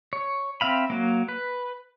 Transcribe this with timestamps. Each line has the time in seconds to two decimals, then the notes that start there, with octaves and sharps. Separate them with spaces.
0.13 C#5
0.61 C4 E5 F5 B5
0.90 F#3 A#3
1.28 B4